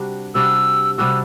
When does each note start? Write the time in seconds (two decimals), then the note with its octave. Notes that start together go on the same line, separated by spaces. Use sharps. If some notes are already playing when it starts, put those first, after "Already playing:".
Already playing: C3 G3 D4 F#4
0.35 C3 G3 D4 F#4 E6
0.98 C3 G3 D4 F#4 E6